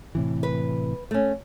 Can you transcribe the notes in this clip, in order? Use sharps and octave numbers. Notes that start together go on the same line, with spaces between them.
A2 C3 E3
B4
A3 C#4